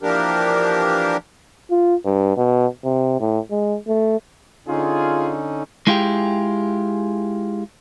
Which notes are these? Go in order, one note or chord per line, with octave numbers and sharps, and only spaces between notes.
E3 F3 A#3 D4 G4 A#4
F4
G2
B2
C3
A2
G#3
A3
D3 C#4 D#4 F4 G#4
G#3 E4 F4 G4 G#4 G5